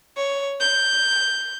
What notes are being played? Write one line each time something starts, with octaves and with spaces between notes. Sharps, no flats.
C#5
G6